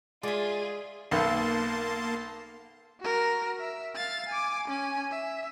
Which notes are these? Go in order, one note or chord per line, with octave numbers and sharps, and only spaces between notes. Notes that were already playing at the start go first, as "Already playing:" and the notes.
G#3 F4 G#4 D5 E5
B1 A#3 A5 C6
F#4 A#4
E5
F5 A6
G#5 D6
C#4 G#5
E5